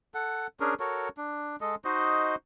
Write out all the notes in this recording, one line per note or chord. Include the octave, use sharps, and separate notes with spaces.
A4 F#5
C#4 D4 G#4 A#4
F#4 A4 A#4 C#5
D4
G#3 A4 D#5
D#4 F#4 C5 D#5